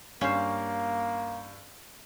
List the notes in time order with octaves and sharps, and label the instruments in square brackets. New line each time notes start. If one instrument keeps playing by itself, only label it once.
[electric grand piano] G2 F5 [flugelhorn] A#3 [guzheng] C#4 C5